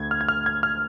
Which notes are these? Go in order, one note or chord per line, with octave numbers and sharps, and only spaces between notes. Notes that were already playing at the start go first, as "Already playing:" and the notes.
Already playing: D2 G#6
F6
G#6
F6
G#6
F6